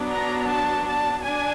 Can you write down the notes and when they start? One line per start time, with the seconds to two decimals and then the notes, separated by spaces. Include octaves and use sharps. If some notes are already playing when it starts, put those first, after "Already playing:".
Already playing: F#3 B3 D4
0.09 A#5
0.47 A5
0.85 A5
1.23 D4 G#5